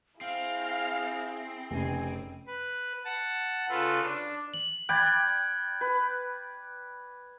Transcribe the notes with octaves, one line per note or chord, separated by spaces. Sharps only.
C4 E4 G#4 F5
F1 C#3 G#5
B4
F#5 A5
C#3 F4 A4 B4
D4
F#7
D5 G5 B5 F#6 G#6
B4